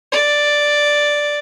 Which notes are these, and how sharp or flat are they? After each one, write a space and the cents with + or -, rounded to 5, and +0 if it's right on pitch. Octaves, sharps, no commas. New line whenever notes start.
D5 +0